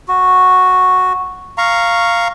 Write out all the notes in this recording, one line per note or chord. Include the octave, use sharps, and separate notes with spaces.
F#4
F5 A#5 C#6